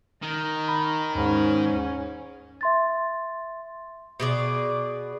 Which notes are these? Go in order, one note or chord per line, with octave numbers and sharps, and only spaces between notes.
D#3 A#5
B5
D#2 G#2 C#4
E5 C6 A6
B2 G#4 D5